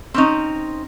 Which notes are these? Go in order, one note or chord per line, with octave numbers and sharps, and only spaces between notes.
C4 C#4 D#4